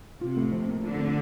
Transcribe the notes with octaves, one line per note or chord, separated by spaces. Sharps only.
C3 F4
A2
F3
A#3
D3 F4
A2